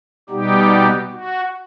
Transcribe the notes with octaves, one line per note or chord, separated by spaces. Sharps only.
B2 G3 B3 D#4 G4
F#4